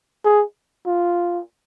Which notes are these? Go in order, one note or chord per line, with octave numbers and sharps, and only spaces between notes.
G#4
F4